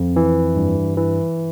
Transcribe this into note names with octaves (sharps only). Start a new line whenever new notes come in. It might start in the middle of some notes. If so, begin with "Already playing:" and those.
Already playing: F2
E3
G2
E3